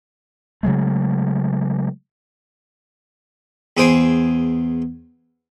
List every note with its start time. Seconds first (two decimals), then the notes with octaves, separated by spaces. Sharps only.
0.63 C#3 F#3 G#3 A3
3.77 E2 G#4 C5 G5 G#5